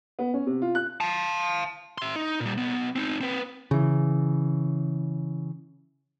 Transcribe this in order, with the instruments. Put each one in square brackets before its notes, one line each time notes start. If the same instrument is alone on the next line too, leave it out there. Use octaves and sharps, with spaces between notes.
[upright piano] B3
C#4
C3
F4
F#6
[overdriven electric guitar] F5 A5
[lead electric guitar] E5 C6
D#4
A#2 G3
B1 B3
C4 D#4
C4 B4
[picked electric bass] C#3 E3